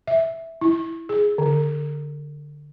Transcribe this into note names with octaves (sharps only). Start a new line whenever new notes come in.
E5
E4
G#4
D3